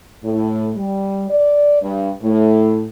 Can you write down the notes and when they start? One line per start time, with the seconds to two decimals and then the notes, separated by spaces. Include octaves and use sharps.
0.24 A2
0.76 G3
1.30 D5
1.82 G2
2.22 A2